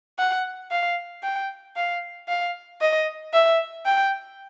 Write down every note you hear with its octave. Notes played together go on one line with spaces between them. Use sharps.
F#5
F5
G5
F5
F5
D#5
E5
G5